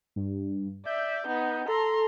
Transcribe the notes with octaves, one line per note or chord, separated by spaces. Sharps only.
G2
D5 E5 G6
B3 D#4
A4 A#5 C6